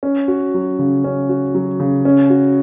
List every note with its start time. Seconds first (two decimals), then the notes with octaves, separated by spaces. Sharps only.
0.03 C#4
0.28 F#4
0.54 F#3
0.79 C#3
1.04 C#4
1.29 F#4
1.55 F#3
1.80 C#3
2.05 C#4
2.30 F#4